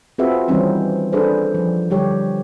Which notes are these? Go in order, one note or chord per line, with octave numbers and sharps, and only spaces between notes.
C4 F4 F#4 G#4 B4 E5
D#3 E3 G3 C4 C#4 D#4
D4 G#4 A4 B4 C5
F3
D3 G3 G4 C#5